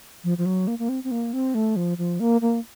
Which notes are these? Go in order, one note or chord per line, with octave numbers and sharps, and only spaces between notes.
F3
F3
F#3
A#3
A#3
C4
C4
A#3
C4
A3
F3
F3
A#3
A#3